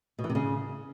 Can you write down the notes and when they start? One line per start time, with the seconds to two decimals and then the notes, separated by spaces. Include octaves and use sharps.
0.19 B2
0.24 E3
0.29 C3
0.35 C#3